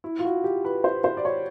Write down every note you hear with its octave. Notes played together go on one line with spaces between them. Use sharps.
E4
F4
F#4
G4
B4
C5
C5
D5
C#5